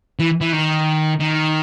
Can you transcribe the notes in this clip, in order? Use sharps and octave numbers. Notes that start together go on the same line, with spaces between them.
E3
E3
D#3
D#3